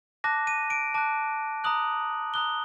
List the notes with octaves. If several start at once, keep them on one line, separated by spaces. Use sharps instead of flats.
A5 D6 F#6 A#6
D#7
D7
A5 D6 F#6
A#5 D#6 F#6 F#7
A#5 D#6 F#6 G7